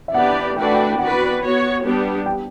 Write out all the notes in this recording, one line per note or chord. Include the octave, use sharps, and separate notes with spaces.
E5
B3 D4 G4 B4 D5 F#5
A3 D4 F#4 B4 D5 G5
F#5
G5
G5
B3 F#4 B4 D5 F#5
B3 F#4 C#5
G3 B3 D4 G4
G5